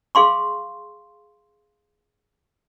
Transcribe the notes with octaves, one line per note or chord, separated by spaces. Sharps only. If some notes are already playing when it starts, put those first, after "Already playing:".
G#4 F5 C6 C#6